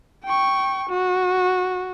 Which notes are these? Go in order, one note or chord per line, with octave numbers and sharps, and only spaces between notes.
G5 C#6
F#4